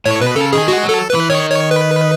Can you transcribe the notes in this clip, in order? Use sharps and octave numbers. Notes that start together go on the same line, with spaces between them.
A2 C#5
B2 B4
C#3 A4
D#3 G#4
G#3 F#4
F#3
A4
E3 B4
D#3 C#5
C#5
B4